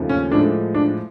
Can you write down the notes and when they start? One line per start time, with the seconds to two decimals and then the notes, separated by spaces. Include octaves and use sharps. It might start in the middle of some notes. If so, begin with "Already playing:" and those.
Already playing: D#2 C#3 F3 A3
0.09 C#4
0.31 A2 F3 G#3 D4
0.74 D4